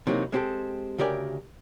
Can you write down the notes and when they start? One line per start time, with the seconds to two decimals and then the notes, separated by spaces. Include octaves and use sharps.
0.07 C3 E3 F#3 A#3 C#4 D#4
0.32 G#3 C4 C#4 F#4 G4 A4
0.98 D2 C#3 G4 A#4 D5 G#5